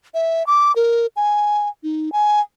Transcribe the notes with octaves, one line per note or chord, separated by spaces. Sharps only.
E5
D6
A#4
G#5
D#4
G#5